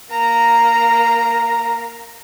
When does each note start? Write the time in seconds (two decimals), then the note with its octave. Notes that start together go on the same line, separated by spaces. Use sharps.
0.11 A#3 A#5